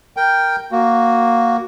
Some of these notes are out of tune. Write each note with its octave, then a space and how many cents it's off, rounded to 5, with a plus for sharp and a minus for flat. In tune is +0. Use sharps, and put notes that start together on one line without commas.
A#4 +0 G5 +0
A#3 +0 F#4 +0